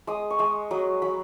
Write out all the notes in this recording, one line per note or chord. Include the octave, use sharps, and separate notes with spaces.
G#3 D#6
C#6
G#3 D#6
F#3 D#6
F#3 B5